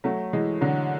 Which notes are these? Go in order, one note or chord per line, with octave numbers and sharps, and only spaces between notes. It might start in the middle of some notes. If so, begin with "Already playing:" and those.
F#3 A3
E3 G#3
D3 F#3